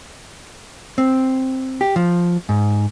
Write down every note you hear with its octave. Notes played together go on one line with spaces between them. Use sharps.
C4
G4
F3
G#2